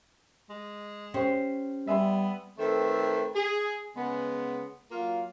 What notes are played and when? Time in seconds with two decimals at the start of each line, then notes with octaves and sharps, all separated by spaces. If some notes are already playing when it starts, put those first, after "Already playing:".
0.49 G#3
1.14 C#4 G4 C5
1.87 G3 B3 E5 G#5 C6
2.58 D#3 A3 C4 A4 B4
3.35 G#4
3.97 C#3 G#3 B3
4.92 F#3 A#3 F4